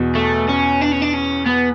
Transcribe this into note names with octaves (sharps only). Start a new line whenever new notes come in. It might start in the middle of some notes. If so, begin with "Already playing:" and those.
Already playing: E2 B2
A3
C#4
D4
C#4
D4
C#4
B3